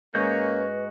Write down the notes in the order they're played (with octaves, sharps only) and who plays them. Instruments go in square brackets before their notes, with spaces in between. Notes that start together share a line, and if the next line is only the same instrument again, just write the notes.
[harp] G#2 [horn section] A#3 C#4 [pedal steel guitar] F#4 D#5 G6 [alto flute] B4